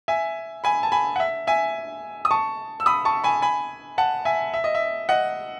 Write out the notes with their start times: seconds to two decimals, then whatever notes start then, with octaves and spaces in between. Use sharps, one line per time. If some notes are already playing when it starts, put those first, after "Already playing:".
0.08 E5 G#5
0.64 G#5 B5
0.83 A5
0.92 G#5 B5
1.16 F#5
1.20 E5
1.47 E5 G#5
2.25 D#6
2.31 A5 C#6
2.80 E6
2.86 B5 D#6
3.05 A5 C#6
3.24 G#5 B5
3.42 G#5 B5
3.98 F#5 A5
4.25 E5 G#5
4.54 E5
4.64 D#5
4.75 E5
5.09 D#5 F#5